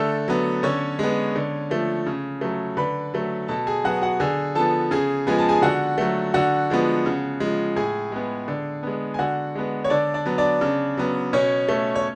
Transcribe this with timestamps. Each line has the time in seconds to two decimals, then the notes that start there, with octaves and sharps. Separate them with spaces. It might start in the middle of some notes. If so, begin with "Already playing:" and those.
Already playing: D3 A3 A4
0.28 F#3 B3
0.63 D3 C#4 C#5
0.99 G#3 B3
1.36 D3
1.70 F3 A3
2.06 C#3
2.41 F#3 A3
2.77 D3 B4 B5
3.14 F#3 A3
3.48 B2 A4 A5
3.67 G#4 G#5
3.84 F#3 B3 F#4 F#5
4.02 F#4 F#5
4.20 D3 G#4 G#5
4.55 F3 B3 A4 A5
4.91 C#3 G#4 G#5
5.27 F3 G#3 B3 G#5
5.39 A5
5.49 G#4 G#5
5.62 D3 F#4 F#5
5.98 F#3 A3
6.34 D3 F#4 F#5
6.70 F3 G#3 B3
7.06 C#3
7.40 F3 G#3
7.76 A2 G#4 G#5
8.12 G#3 B3
8.48 D3
8.83 G#3 B3
9.14 G#5
9.19 D3 F#4 F#5
9.55 G#3 B3
9.84 C#5
9.90 D3 D4 D5
10.14 D4 D5
10.26 F#3 B3
10.38 D4 D5
10.61 C#3
10.97 F#3 B3
11.33 B2 C#4 C#5
11.68 A3
11.95 C#5